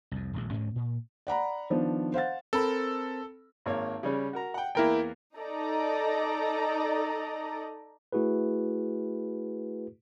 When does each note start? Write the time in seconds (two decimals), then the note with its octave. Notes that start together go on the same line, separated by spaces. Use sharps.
0.11 C2 F2
0.33 D#1 A#1 G#3
0.51 D2 G#2 C#4
0.76 A#2
1.27 D5 F#5 A#5 B5
1.70 D#3 F3 B3 D4
2.14 C5 F5 F#5 A6
2.53 C4 A4 A#4 B5
3.66 G#1 A#3 C#5
4.03 C#3 G3 C#4
4.33 F#4 A#4 A#5
4.54 F#5 G5
4.75 E2 A#3 E4 A#4 G5
5.37 D#4 A4 D5 D#5 A#5
8.12 A3 E4 F#4 G#4 B4